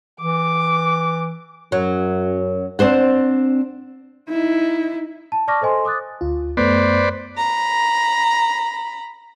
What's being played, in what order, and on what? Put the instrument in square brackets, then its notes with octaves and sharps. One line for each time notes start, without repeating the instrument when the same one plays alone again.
[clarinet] E3 [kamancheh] D6
[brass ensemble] F#2 [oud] F#3
[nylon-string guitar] C4 D4 C5 F#5
[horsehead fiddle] D#4 E4
[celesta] A5
D5 A5 C#6 D6 F6 A#6
A4 C5 D#5 G#5 C6
D6 D#6 F#6 A6
[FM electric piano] D2 F4
[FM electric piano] F#2 A3 B3 [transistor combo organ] B4 C5 D5
[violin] A#5 B5